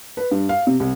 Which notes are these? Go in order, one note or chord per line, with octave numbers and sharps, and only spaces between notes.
B4
G2
F5
C3
C2